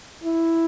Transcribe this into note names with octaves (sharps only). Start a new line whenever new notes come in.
E4